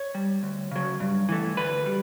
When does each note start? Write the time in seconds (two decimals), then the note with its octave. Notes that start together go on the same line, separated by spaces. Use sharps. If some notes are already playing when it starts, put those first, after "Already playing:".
Already playing: C#5
0.15 G3
0.43 D2
0.71 C#3 F#3
1.00 G2
1.29 E3 A3
1.57 D2 B4
1.86 G3